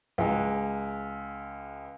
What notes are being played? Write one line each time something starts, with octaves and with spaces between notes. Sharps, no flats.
C#2 G#3